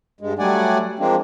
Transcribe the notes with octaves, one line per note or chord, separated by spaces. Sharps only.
G2 G#3
F#3 G3 A3 D5 F#5 G#5
F3 G#3 A#3 C4 D4